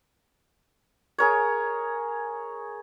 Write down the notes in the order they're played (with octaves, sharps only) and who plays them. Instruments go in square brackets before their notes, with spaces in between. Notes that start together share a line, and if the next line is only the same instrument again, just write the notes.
[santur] G#4 A#4 C#5